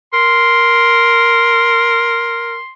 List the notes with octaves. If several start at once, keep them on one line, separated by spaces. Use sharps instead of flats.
A#4 C6